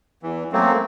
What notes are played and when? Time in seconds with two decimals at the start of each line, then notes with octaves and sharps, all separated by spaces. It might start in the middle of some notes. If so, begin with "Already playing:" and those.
0.23 E2 E3
0.52 F#2 F#3 A3 A#3 C4